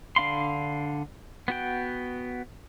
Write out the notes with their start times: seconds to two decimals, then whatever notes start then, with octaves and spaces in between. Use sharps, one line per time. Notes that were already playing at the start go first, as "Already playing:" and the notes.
0.16 D3 D4 F5 B5 C6
1.48 B3 F#4 G5